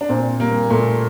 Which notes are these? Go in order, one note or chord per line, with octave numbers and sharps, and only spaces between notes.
D4
A#2 C4
G3 A#3
A#2 A3